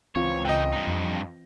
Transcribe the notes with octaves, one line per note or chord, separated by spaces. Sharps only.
C#2 E3 C4 F4 C#5
D3 D#4 D#5 G5
G2 D#4
F2